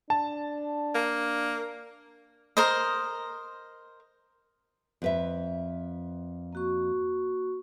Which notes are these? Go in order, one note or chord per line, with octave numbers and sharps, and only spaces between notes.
D4 A5
A#3
A#4 C5 D#5
F2 B4 E5
A#3 F#4 C#6